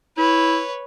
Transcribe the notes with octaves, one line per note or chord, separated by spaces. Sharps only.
E4 B4 C#5